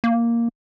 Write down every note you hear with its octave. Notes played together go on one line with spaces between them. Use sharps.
A#3